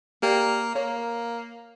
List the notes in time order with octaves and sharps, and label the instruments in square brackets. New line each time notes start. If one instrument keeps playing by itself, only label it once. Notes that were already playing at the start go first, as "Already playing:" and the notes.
[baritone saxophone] A#3 [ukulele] G4 D5
[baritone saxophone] A#3 [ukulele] C#5